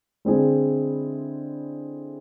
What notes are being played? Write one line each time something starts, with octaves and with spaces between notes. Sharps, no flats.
D3 G#3 C4 E4 G#4